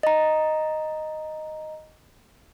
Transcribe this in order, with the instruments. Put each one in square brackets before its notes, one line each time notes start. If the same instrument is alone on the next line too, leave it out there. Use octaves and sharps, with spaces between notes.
[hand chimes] D#5 A#5